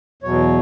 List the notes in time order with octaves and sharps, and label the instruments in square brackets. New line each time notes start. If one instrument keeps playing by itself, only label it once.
[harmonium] E2 B2 F#3 C#5